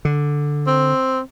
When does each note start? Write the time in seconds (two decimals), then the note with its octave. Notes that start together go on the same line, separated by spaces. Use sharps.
0.05 D3
0.67 C4